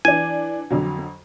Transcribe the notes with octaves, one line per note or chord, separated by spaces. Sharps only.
E3 D4 G#5
F2 D3 F#3